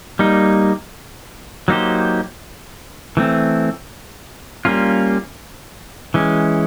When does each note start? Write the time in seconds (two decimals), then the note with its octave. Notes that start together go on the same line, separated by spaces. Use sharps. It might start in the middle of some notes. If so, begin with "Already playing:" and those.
0.19 G3 A#3 D#4
1.68 F#3 A#3 D#4 G4 C5
3.17 E3 A3 C4
4.65 G3 A#3 C#4 F4
6.14 E3 G#3 C#4